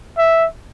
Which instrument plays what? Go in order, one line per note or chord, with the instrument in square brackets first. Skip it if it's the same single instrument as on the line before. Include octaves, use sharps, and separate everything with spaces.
[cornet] E5